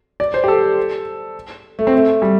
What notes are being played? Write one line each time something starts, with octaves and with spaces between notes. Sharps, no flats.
D5
C5
G4
A4
A3
C4
A3
G3